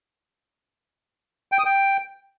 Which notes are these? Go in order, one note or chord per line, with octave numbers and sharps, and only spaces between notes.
G5
D#6
G5